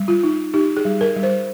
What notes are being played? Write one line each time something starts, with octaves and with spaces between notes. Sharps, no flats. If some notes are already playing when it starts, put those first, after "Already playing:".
Already playing: G3
F4
D#4
D#4 G4
G#4
G3
A#4
G3
C5